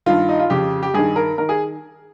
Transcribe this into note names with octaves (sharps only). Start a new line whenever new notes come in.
G2 D#3 F4
D#4
F4
F2 C#3 G4
G4
G2 D#3 G#4
A#4
D#3 A#4
G#4